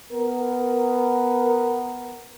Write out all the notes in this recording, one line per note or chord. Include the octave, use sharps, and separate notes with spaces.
B3 A#4